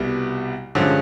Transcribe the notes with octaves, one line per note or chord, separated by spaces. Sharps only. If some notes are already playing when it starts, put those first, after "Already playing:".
Already playing: C2 B2 G3 B3
G2 D3 F3 G#3 C#4